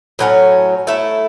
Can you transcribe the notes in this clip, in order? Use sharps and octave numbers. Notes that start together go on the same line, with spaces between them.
A2 F#3 A3 C#4
A3 E4 A4